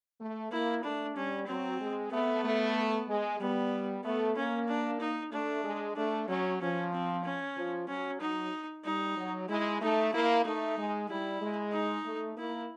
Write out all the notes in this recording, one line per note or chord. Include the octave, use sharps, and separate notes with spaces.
A3
A#3 E4
A3 D4
G3 C#4
F#3 C4
G#3
A3 B3
A3
G#3
G3 B3
A3 B3
A#3 C#4
D4
D#4
A3 D4
G#3
A3 D4
F#3 C#4
F3 C#4
C4
C#4
F3
F#3 C#4
F#3 D#4
G3 D#4
F#3
G#3 E4
A3 D#4
A#3 E4
A3 D#4
G#3
G3 E4
G#3
D#4
A3
A#3 E4